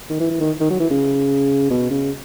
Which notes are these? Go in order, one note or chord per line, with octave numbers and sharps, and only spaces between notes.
D#3
E3
E3
D#3
D#3
F#3
E3
C#3
B2
C#3